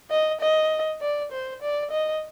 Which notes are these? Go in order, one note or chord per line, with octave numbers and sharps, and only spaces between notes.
D#5
D#5
D5
C5
D5
D#5